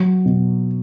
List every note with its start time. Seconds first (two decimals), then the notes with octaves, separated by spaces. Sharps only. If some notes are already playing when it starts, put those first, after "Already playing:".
Already playing: F#3
0.25 B2